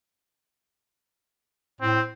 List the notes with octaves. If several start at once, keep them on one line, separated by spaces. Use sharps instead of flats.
A2 C4